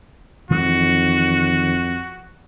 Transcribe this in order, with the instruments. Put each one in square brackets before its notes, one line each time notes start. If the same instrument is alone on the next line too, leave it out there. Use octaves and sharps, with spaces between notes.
[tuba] F2 [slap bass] D#3 E3 G#3 [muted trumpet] F#4